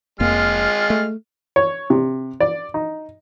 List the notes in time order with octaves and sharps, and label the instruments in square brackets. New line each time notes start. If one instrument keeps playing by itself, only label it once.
[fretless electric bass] F1 F2 A#3 [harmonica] G#3 F6 [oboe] F4
[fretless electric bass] A3
[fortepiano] C#5
C3
D5
D#4